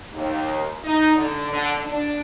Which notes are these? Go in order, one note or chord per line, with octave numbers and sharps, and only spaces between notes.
D#2
D#4
D3
D3
D4